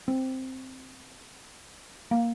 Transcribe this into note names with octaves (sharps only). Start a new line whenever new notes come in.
C4
A#3